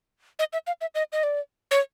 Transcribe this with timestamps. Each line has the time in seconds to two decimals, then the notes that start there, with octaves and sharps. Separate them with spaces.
0.39 D#5
0.53 E5
0.67 F5
0.81 E5
0.95 D#5
1.13 D#5
1.23 D5
1.71 C#5